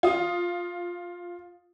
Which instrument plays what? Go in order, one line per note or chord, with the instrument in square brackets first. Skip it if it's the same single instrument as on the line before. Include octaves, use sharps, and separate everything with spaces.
[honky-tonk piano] F4 D#6